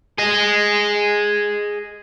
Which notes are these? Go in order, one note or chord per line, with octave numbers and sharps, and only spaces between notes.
G#4 D#5